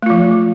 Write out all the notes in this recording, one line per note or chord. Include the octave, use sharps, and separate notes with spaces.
F3 A3 F4